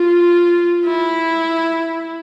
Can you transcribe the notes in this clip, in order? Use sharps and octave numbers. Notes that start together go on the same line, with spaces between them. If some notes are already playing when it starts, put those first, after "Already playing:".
Already playing: F4
E4